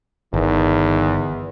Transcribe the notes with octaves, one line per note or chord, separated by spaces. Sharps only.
G1 E2 D#3